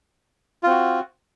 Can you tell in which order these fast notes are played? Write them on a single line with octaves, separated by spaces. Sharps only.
F4 C4 F#4